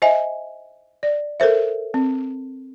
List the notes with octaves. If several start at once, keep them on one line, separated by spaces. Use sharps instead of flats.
C5 D#5 E5 G#5
D5
A4 A#4 C5 E5
C4